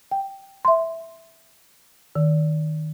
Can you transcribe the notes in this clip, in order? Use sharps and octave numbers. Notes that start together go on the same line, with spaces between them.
G5
E5 C6
D#3